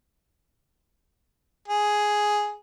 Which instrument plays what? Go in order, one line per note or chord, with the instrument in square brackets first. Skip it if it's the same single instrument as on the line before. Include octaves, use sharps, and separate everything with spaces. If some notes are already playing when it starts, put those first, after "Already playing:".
[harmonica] G#4